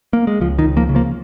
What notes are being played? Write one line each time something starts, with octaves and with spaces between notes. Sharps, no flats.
A#3
G#3
C#2 F3
D#3
C#2
F3 A#3
C#3
F3 A#3